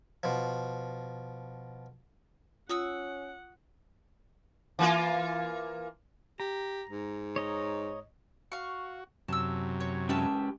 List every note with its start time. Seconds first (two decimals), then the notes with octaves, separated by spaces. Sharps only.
0.23 B2 F3
2.69 C#4 F4 F#5 C#6 D#6 E6
4.79 E3 A#3 F4
6.40 G4 A#5
6.90 G#2
7.36 C#5 D#5 A#5
8.52 F#4 F5 C#6
9.28 F#2 C3 F#3 A5 E6
9.80 C#5
10.09 G#3 C#4 G4 B4 E5 A5